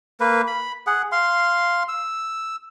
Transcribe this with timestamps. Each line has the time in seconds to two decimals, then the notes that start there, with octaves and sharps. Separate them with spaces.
0.20 A#3 B4
0.47 B5
0.87 G#4 F#5
1.12 F5 C6
1.88 E6